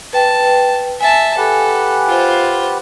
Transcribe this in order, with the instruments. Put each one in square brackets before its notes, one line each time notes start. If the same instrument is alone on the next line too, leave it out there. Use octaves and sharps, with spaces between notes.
[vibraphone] B4 G5 [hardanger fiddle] A5
[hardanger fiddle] E5 A5 [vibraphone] G#5
[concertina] G4 B4 F#5 [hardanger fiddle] A4
[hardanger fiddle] F4 C5